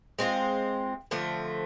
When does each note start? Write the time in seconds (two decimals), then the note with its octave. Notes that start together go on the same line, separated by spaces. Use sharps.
0.19 G#3 C4 F4
1.11 D3 F3 A3 C4